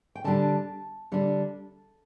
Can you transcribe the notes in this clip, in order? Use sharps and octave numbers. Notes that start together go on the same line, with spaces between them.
G5
D3 G3 D4 A5
D3 G3 D4